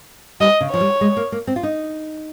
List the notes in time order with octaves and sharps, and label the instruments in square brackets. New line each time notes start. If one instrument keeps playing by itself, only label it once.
[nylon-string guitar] G3 [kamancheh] D#5
[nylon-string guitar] C#3
[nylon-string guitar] F3 [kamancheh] C#5
[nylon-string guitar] G3
G#3
A#3
A#3
C4
F4
D#4